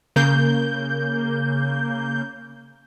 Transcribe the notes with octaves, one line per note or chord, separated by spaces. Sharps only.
C#3 A#3 G6